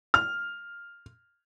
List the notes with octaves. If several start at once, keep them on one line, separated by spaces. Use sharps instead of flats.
F6